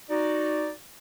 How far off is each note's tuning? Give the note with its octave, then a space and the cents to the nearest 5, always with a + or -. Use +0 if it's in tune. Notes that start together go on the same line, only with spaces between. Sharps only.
D#4 +0 F#4 +0 D5 +0